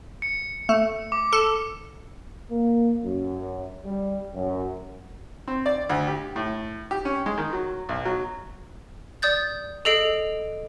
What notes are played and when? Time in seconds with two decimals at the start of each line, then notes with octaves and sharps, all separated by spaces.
0.22 C#7
0.69 A3
1.12 D6
1.33 A4
2.50 A#3
3.03 F#2
3.85 G3
4.34 F#2
5.48 C4
5.66 D5
5.90 D2
6.07 G4
6.36 A2
6.91 G4
7.05 C#4
7.26 G#3
7.38 D#3
7.53 F#3
7.89 B1
8.05 F#3
9.22 D5 D#6 G6 A6
9.85 G#4 A4 D#5 C7 D7